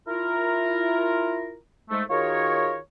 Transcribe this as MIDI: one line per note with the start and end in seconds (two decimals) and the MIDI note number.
0.08 1.56 64
0.08 1.56 65
0.08 1.56 70
1.90 2.03 44
1.90 2.03 56
1.90 2.03 57
2.10 2.77 51
2.10 2.77 65
2.10 2.77 66
2.10 2.77 68
2.10 2.77 70
2.10 2.77 73